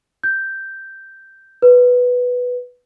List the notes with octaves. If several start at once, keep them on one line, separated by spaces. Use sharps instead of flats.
G6
B4